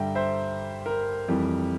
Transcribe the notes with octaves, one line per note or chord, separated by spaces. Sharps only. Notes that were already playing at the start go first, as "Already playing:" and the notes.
Already playing: G2 D3 G3 E5 G5 A#5
C5 E5
A#4
F2 E3 G3